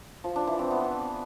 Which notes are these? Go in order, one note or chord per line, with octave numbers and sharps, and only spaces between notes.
F3
D4
E3
C4
B3